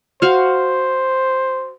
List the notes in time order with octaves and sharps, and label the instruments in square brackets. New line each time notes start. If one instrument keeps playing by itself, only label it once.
[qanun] F#4 F5 [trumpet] C5